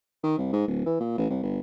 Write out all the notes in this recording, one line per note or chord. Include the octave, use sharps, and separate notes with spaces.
D#3
C2
G#2
D1
E3
A#2
A1
C2
G1